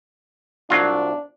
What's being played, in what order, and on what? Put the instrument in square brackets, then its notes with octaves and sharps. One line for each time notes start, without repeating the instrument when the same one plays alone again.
[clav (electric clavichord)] C2 F#3 F4 [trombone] D4